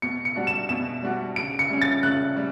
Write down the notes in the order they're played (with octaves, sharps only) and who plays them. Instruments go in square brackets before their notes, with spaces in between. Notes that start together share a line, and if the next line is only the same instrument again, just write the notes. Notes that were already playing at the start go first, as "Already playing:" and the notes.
[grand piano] B2 [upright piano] C#7
[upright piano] C#7
[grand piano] G3 D4 F#4
[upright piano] E7
[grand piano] B2 [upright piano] E7
[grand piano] G3 D4 F#4
[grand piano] C#3 [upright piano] D7
[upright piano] C#7
[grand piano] G3 C#4
[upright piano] A6
[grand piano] C#3 [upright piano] F#6
[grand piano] G3